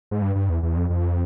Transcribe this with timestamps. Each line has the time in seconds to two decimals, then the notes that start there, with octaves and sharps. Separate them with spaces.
0.11 G#2
0.22 G2
0.36 G2
0.49 E2
0.63 E2
0.77 F2
0.90 F2